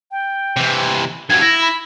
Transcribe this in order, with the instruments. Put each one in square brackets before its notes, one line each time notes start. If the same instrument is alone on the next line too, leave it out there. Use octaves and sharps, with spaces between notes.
[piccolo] G5
[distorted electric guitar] C3 E3
[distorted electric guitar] G2 F#3 [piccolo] G#6
[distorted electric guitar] E4 [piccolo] A#6
[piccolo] B5